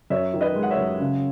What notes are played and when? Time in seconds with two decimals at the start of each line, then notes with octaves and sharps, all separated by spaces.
0.10 F#2 C#5 E5
0.34 D#3
0.41 B4 D#5
0.55 G#3
0.63 F#5
0.71 C#5 E5
0.78 F#2
1.00 C#3